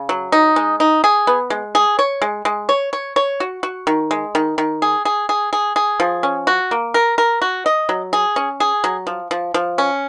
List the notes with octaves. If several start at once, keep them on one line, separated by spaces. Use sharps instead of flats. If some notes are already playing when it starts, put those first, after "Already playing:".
Already playing: C#3
F#3
D#4
G#3
D#4
G#4
B3
G#3
G#4
C#5
G#3
G#3
C#5
C#5
C#5
F#4
F#4
D#3
G#3
D#3
D#3
G#4
G#4
G#4
G#4
G#4
F3
C#4
F#4
A#3
A#4
A#4
F#4
D#5
F#3
G#4
C#4
G#4
F#3
F3
F3
F3
C#4